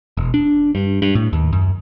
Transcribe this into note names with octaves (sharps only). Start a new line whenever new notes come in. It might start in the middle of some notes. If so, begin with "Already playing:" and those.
E1
D4
G2
G2
A2
D#2
F#2